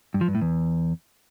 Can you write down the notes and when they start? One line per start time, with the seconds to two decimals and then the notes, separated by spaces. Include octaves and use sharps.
0.14 G2
0.21 F3
0.28 G2
0.35 A2
0.41 E2